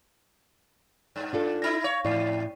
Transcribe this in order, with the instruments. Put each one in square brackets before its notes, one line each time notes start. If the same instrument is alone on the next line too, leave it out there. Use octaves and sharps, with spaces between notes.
[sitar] G2
[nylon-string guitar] D4 F4 A4
[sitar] G2 D#4 E4 [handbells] A#6
[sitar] C#5 [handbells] F5
[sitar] E2 [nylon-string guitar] A2 [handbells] E4 D5 C7